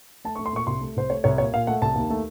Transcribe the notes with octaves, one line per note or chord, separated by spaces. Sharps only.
A3 A5
C#6
A3
C6
A#2 C#6
C2 C6
A3
C2 C5
A3 C#5
C2 C#5
A#2 C#5
A#2 F5
A3 F#5
C2 A5
D#2
A3